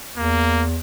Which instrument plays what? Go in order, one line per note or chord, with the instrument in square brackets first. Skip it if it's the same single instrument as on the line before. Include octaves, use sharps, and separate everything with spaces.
[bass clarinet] E2 [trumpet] A#3